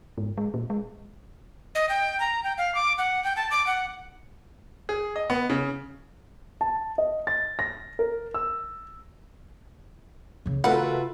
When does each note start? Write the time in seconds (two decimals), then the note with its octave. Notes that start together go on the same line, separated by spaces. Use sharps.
0.18 G#2
0.38 G#3
0.54 A#2
0.70 G#3
1.75 D#5
1.89 G5
2.20 A#5
2.44 G5
2.58 F5
2.75 D6
2.98 F#5
3.24 G5
3.37 A5
3.51 D6
3.67 F#5
4.89 G#4
5.16 D#5
5.30 B3
5.50 C#3
6.61 A5
6.98 D#5
7.27 A6
7.59 A#6
7.99 A#4
8.34 E6
10.46 C#3 E3
10.64 A3 F4 F#4 A#4 B4 F#5